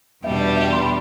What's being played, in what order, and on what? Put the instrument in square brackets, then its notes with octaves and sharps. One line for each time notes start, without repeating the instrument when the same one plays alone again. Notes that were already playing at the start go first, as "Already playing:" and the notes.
[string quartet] E2 B2 G3 D4 G4 [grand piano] E5
[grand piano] D5
E5
C6
B5